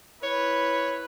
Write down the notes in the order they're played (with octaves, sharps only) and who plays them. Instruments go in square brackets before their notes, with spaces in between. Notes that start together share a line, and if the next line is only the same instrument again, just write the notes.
[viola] E4 B4 [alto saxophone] C#5